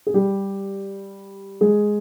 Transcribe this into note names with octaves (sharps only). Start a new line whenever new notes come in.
G#4
G3 G4
G#3 G#4